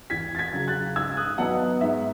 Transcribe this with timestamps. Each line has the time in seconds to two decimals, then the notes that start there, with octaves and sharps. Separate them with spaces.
0.10 E2 G#6 B6
0.35 A6
0.38 G#6 B6
0.53 C#3 F#3
0.68 F#6 A6
0.96 G#2 E6 G#6
1.17 D#6 F#6
1.38 F#3 B3 D#4 F#5 A5
1.81 G#2 E5